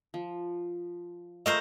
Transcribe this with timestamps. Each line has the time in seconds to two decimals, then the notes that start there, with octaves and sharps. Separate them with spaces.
0.14 F3
1.46 A3 F4 G#4 A#4 C5 D#5